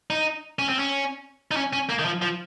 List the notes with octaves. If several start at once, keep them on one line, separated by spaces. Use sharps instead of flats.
D#4
C#4
C4
C#4
D#4
C#4
C#4
A#3
D#3
F3
F3